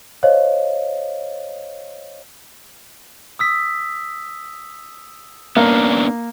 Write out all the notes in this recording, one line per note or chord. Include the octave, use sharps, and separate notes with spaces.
C5 C#5 D#5 F5
D#6 E6 B6
A#3 B3 C#4 D4